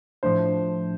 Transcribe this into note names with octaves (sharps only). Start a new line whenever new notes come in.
A2 F3 A3 D4 C5